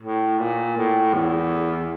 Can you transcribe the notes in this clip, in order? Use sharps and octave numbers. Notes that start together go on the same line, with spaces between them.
A2
A#2
A2
E2